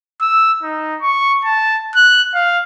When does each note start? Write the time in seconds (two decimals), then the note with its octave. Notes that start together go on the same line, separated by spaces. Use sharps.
0.21 E6
0.63 D#4
1.02 C#6
1.44 A5
1.96 F#6
2.34 F5